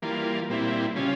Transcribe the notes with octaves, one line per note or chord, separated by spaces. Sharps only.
E3 G3 A#3 F4
A#2 G3 C4 E4
C#3 G3 C#4 F4